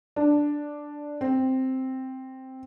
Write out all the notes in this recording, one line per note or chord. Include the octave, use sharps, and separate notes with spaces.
D4
C4